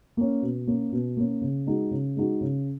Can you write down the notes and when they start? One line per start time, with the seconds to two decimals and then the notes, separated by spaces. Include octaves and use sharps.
0.17 A#3 C#4
0.42 B2
0.67 A#3 C#4
0.92 B2
1.17 A#3 C#4
1.41 C#3
1.67 G#3 D#4 F#4
1.91 C#3
2.16 G#3 D#4 F#4
2.41 C#3